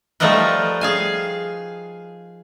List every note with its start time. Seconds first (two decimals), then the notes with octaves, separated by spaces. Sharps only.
0.20 F3 G3 A3 D#4 A#4 B4
0.81 G#4 F5 G#5